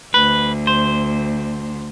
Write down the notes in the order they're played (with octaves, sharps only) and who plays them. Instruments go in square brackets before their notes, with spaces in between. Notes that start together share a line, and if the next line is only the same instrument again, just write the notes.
[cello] D2 [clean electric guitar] B4
[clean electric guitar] C5